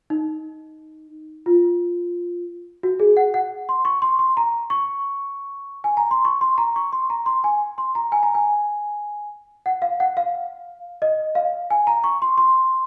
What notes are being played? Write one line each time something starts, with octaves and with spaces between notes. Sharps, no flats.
D#4
F4
F#4
G#4
F#5
F#5
C6
C#6
C6
C6
A#5
C#6
G#5
A#5
C6
C#6
C6
A#5
C#6
C6
A#5
C6
G#5
C6
A#5
G#5
A#5
G#5
F#5
F5
F#5
F5
D#5
F5
G#5
A#5
C#6
C6
C6